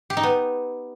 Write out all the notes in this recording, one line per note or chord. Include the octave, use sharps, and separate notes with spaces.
G4
D#4
B3